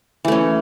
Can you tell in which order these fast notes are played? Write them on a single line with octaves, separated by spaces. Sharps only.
E3 A3 C#4